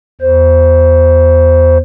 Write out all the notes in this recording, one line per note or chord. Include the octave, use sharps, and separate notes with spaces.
E2 C5